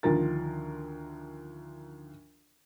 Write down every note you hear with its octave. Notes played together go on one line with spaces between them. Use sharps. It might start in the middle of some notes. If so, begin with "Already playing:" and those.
D2 D#3 F3 F4 A#4 A6